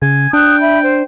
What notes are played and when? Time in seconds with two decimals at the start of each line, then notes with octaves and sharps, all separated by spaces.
0.02 C#3 G#5
0.33 D4 G5 D#6 F#6
0.61 E5 B5
0.82 C5